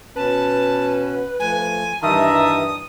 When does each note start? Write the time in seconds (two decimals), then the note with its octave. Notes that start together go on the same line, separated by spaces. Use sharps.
0.16 B2 C#4 B4 A5
1.40 F3 A3 G#5
2.03 G2 D#3 E3 G3 E5 A5 A#5 D#6